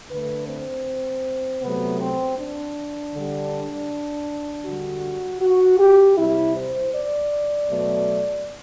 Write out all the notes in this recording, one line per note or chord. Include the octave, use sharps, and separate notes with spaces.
D3 A3 B4
C4
C3 F#3 A3 B3
C4
D4
D3 G3
D3 G3 F#4
F#4
G4
C3 G3 E4
C5
D5
B2 F#3 A3